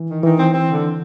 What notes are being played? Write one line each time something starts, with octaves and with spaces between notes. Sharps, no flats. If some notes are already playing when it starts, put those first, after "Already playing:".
Already playing: E3
D#3
D#3 E3
C4
C4
D3